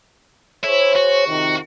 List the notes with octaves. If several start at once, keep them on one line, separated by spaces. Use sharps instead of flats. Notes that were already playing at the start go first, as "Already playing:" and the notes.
E4 G#4 C5 C#5
F#4
F2 C3 D#3